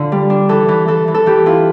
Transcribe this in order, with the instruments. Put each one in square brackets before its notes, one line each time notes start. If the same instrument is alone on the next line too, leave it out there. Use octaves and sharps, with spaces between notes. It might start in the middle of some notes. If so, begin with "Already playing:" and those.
Already playing: [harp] D3 F4
G3
D4
E3 A4
E3
E3 A4
E3
A4
E3 G4
E4 F4